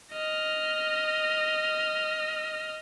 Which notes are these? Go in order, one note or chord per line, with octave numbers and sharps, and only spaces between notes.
D#5 F6